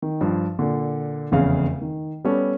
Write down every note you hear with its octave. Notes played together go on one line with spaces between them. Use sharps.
D#3
G2 F3
A#2 D3
F1 E2 C#3 F5
D#3
G3 B3 C#4 A4